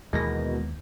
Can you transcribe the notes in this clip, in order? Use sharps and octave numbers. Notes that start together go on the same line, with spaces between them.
D#2 B2 E3 G#3 A#4 A#6